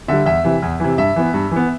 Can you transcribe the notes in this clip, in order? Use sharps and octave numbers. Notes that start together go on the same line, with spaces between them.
D3 G3 E5
E2 E5
C3 E3
E2
C3 E3
G2 E5
E3 B3
G2
E3 B3